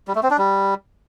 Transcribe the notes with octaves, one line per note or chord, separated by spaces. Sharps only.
G3
A3
C4
D4
G3